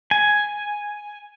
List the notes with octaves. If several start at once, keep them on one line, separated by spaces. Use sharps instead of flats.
G#5